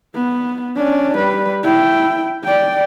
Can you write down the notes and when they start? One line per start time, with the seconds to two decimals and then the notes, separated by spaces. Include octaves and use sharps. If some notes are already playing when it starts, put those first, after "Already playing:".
0.14 B3
0.76 C#4 D4
1.18 G3 B4
1.63 E4 G5
2.44 D5 G5